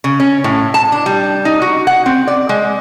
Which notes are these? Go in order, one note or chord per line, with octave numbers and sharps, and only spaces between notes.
C#3
C#4
A2
A5
D4
G3
D#4
F#4
F#5
C4
D5
G#3